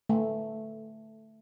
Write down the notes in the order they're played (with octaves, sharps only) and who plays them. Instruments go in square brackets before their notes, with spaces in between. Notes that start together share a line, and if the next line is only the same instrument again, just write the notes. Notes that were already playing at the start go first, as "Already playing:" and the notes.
[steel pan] A3